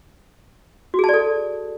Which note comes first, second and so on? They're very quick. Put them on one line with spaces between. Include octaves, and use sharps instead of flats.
F#4 G#4 A5 D5 A4